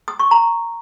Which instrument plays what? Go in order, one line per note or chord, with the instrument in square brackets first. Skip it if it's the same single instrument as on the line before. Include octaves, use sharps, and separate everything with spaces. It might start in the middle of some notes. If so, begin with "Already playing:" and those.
[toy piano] D#6
C#6
A#5